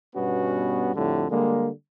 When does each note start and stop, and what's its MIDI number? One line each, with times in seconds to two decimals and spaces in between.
0.15 0.90 43
0.15 0.90 47
0.15 0.90 59
0.15 0.90 61
0.15 0.90 66
0.95 1.24 41
0.95 1.24 45
0.95 1.24 50
0.95 1.24 55
1.30 1.68 50
1.30 1.68 55
1.30 1.68 56
1.30 1.68 58